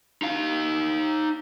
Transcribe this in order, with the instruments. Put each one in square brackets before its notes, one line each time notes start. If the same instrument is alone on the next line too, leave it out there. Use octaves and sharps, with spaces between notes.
[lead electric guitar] D#4 F5